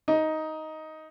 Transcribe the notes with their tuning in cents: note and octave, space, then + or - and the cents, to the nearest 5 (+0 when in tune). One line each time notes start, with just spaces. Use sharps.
D#4 +10 D#5 +10